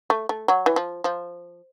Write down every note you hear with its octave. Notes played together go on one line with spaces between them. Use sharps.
A3
A3
F#3
E3
F3
F3